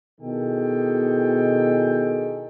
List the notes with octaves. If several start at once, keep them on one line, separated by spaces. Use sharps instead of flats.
B2 D#3 E4 G#4 A4 G5